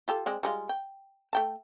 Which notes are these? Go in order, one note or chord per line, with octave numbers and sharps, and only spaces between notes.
F4 G4 A4
G#3 C4 D5
G3 G#3 F4
G5
A3 G5 A5